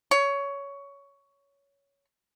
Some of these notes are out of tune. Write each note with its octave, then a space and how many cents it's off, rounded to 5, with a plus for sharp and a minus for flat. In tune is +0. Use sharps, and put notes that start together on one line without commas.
C#5 +15